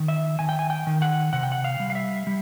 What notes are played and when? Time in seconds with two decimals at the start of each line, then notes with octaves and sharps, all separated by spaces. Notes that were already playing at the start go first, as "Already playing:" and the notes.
Already playing: D#3
0.08 E5
0.39 D#3 G#5
0.49 G5
0.59 G#5
0.70 G5
0.87 D#3
1.02 F#5
1.33 C3 F#5
1.43 G5
1.52 F#5
1.64 F5
1.80 G3
1.90 F5
1.95 E5
2.27 G3